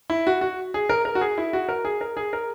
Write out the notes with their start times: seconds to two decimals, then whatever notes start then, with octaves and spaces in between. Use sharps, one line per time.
0.10 E4
0.27 F#4
0.41 F#4
0.74 G#4
0.89 A#4
1.05 A#4
1.15 F#4
1.21 G#4
1.38 E4
1.53 F#4
1.69 A#4
1.85 G#4
2.01 A#4
2.17 G#4
2.33 A#4